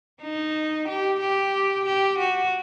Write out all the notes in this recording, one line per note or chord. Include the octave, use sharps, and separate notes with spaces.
D#4
G4
G4
G4
F#4